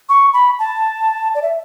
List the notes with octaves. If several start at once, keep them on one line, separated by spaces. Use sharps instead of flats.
C#6
B5
A5
D5
E5